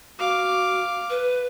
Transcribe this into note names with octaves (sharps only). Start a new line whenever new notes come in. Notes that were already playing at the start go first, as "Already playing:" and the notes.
F#4 F5 D6
B4